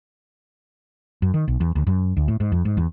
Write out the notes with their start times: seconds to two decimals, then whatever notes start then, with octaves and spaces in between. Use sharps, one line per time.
1.22 F#2
1.34 D#3
1.48 B1
1.60 E2
1.75 D2
1.87 F#2
2.17 D2
2.28 A2
2.40 G#2
2.52 F2
2.65 G#2
2.77 E2